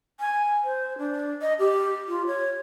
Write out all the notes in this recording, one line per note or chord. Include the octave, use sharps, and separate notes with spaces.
G#5
C5
D4
D#5
G4
F4
C#5